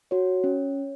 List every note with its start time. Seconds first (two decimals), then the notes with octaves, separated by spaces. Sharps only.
0.11 F#4 C#5
0.44 C#4